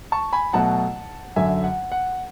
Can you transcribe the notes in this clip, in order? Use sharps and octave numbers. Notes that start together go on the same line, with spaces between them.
A5 C#6
G#5 B5
B2 F#3 A3 F#5 A5
F#2 D3 F#3 E5 G#5
F#5
F#5